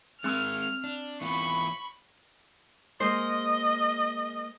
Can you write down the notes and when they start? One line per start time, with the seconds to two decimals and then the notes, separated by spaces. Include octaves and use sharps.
0.24 G#3 C4 A#4 C6 E6 F6
0.84 D4
1.21 E3 B3 F4 B5 C#6
3.00 G#3 A#3 C5 D#5